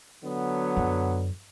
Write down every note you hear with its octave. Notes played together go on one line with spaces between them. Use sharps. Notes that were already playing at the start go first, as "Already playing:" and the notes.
D3 F#3 B3
F#2